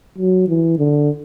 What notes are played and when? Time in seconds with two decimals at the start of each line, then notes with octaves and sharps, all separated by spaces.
0.18 F#3
0.48 E3
0.78 D3